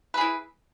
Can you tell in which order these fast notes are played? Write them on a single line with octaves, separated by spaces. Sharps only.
B4 G#4 E4